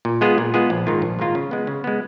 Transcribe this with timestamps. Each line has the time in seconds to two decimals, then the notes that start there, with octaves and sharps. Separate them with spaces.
0.05 A#2
0.21 G#3 B3 F4 G#4
0.38 A#2
0.54 G#3 B3 F4 G#4
0.70 A#1
0.87 G#2 D#3 A#3 F4
1.02 A#1
1.19 G#2 D#3 A#3 F4
1.35 C#3
1.51 G#3 B3
1.67 C#3
1.84 G#3 B3